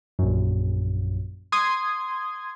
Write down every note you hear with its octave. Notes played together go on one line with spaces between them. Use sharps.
A#1 F#2
C6 D#6 G#6